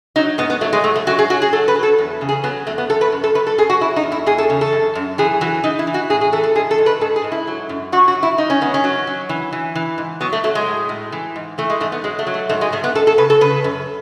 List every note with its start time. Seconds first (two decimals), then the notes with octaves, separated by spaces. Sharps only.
0.16 F#3 D#4
0.38 G#2 B3
0.50 B3
0.61 F#3 A3
0.73 G#3
0.84 G#2 A3
0.96 A3
1.07 F#3 F#4
1.19 G#4
1.30 F#3 F#4
1.42 G#4
1.53 F#3 A4
1.68 B4
1.75 F#3
1.83 A4
1.98 E2
2.21 C#3
2.29 G#4
2.44 F#3 B3
2.67 E2 A3
2.78 B3
2.90 F#2 A4
3.01 B4
3.12 F#2
3.24 A4
3.35 F#2 B4
3.47 A4
3.58 F#2 G#4
3.70 F#4
3.81 F#3 E4
3.96 D#4
4.03 E2
4.12 E4
4.26 E2 G#4
4.38 A4
4.50 C#3
4.61 A4
4.72 F#2
4.95 F#2
5.18 E3 G#4
5.41 E3 F#4
5.64 E3 D#4
5.79 E4
5.87 E3
5.94 F#4
6.10 A2 G#4
6.21 G#4
6.32 E3 A4
6.44 A4
6.56 G#2 G#4
6.71 A4
6.78 G#2
6.86 B4
7.01 G#2 A4
7.16 G#4
7.24 G#2
7.32 E4
7.47 F#3
7.69 F#2
7.92 F#3 F#4
8.08 F#4
8.15 F#2
8.23 E4
8.38 F#2 D#4
8.50 C#4
8.61 D#3 B3
8.74 C#4
8.84 F#3
9.07 F#3
9.29 E3
9.53 E3
9.75 E3
9.98 G#2
10.21 F#3 B3
10.33 A3
10.44 F#3 A3
10.55 G#3
10.67 A2
10.89 A2
11.12 E3
11.36 G#2
11.58 E3 A3
11.70 G#3
11.80 G#2 A3
11.92 B3
12.04 F#3 G#3
12.19 A3
12.27 F#3
12.34 A3
12.49 G#2 A3
12.61 G#3
12.72 G#2 A3
12.84 B3
12.95 F#2 A4
13.07 A4
13.18 C#3 B4
13.30 A4
13.41 C#3 B4
13.64 F#2